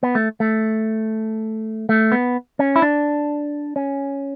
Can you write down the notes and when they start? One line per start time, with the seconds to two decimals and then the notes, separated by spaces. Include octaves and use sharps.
0.03 B3
0.15 A3
0.40 A3
1.89 A3
2.12 B3
2.59 C#4
2.76 E4
2.82 D4
3.76 C#4